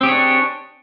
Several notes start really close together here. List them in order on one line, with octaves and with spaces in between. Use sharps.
C4 G4 G#4 C#5 D4